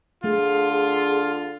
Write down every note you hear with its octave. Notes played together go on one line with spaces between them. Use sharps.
D3 A3 F4 G#4
G#4